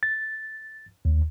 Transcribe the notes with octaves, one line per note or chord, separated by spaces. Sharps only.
A6
D#2